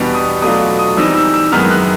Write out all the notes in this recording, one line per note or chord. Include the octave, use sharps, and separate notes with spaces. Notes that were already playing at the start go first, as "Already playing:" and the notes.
Already playing: E2 B2 G3 B3 D4
D#6
B2 F#3 A3 D4 F4 D#6
D#6
E3 G3 C4 D#4 E6
E6
E6
F#2 D#3 G#3 B3 D#4 F6
F#6